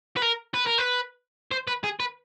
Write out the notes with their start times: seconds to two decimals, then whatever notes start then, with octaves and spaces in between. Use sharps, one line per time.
0.17 B4
0.22 A#4
0.54 B4
0.67 A#4
0.79 B4
1.52 C5
1.68 B4
1.84 G#4
2.00 B4